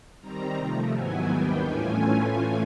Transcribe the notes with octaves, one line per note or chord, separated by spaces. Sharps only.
D#3 G3 C4 A#5
C3 F3 A3
G#2 D#3 F#3 B3 E4 G#5
D#2 D#3 G3 B3 D4 G5
A2 E3 A3 C#4 F4 G#5